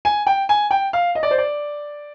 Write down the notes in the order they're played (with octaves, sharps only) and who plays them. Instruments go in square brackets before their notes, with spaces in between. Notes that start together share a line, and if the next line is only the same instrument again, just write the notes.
[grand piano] G#5
G5
G#5
G5
F5
D#5
D5
C5
D5